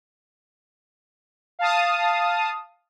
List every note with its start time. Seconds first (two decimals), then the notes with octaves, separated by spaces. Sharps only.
1.59 F5 A5 D#6